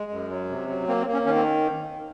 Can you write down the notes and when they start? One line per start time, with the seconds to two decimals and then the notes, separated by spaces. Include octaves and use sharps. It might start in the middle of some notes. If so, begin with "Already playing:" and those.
Already playing: G#3
0.11 F#2
0.30 F#3
0.49 C3
0.68 F#3
0.87 A#3 C4
1.00 C4
1.07 A#3
1.13 C#4
1.25 D#3 C#4
1.36 C4